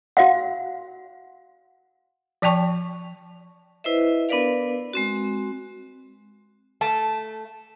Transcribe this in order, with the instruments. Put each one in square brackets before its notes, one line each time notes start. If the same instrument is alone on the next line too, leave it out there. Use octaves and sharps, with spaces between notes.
[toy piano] F#4 F5 F#5
[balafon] F3 D5 G5 A5 C#6
[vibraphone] E4 B4 C5 D#5 E5
B3 D4 A#4 B4 D5 F5
G#3 C4 F#4
[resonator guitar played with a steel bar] A3 A5